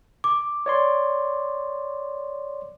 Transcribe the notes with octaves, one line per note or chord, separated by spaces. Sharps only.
D6
C#5 D5 C6